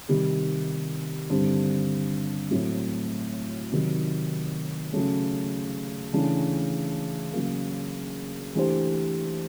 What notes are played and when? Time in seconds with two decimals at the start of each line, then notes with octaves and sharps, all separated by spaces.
0.09 C3 D#3 G3
1.30 G2 D3 G3 C4
2.51 A2 F#3 A3 C4
3.72 C3 D#3 F#3
4.92 C#3 F#3 A3 C#4
6.13 C#3 E3 A3 D4
7.33 C#3 F#3 A#3
8.55 E3 A3 D4 G4 C5